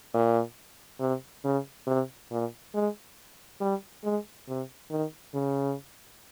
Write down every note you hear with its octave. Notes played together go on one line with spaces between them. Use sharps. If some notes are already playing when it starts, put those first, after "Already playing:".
A#2
C3
C#3
C3
A#2
G#3
G3
G#3
C3
D#3
C#3